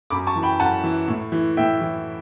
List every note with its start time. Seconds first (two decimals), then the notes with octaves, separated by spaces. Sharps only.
0.10 F#2 B5 D6
0.27 A5 C#6
0.36 E3
0.43 G5 B5
0.60 F#2 F#5 A5
0.84 E3
1.08 A2
1.32 E3
1.57 A2 E5 G5
1.81 E3